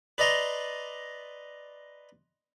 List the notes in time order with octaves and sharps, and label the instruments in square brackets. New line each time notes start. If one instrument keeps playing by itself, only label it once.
[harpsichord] B4 D5 D#5 A#5 C6